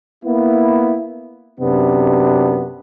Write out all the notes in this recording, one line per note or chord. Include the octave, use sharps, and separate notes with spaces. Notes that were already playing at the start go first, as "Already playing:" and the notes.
A#3 B3 E4
F#2 C3 B3 D4